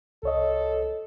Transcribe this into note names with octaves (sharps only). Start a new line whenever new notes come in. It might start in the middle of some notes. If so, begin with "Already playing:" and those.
C2 A4 C#5 D#5